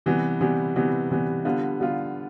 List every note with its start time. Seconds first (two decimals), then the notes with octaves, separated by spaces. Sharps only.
0.06 C3 E3 G3 B3
0.41 C3 E3 G3 B3
0.76 C3 E3 G3 B3
1.10 C3 E3 G3 B3
1.45 D3 G3 B3 F4
1.80 D3 G3 B3 F4